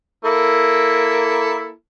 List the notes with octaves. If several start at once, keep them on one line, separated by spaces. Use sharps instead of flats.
A#3 E4 A4